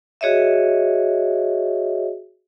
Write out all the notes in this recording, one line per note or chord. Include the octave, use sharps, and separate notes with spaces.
F#4 G#4 C#5 D#5 E5